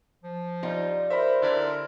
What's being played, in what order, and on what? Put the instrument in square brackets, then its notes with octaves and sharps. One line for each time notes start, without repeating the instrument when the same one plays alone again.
[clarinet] F3
[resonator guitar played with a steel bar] G3 D#4 F4
[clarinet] A#4 [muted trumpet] C5 [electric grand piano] E5 B5
[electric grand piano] D3 E4 A#4 [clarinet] D5